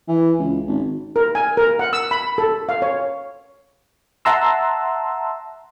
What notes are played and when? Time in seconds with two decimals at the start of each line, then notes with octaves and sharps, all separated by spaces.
0.08 E3
0.39 C#2
0.68 G#1
1.16 A#4
1.35 G#5
1.57 A#4
1.79 F#5
1.93 E6
2.11 B5
2.38 A4
2.69 F5
2.82 C#5
4.25 E5 F#5 A5 A#5 C6 E6